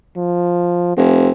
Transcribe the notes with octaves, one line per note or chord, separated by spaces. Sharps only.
F3
F1 C4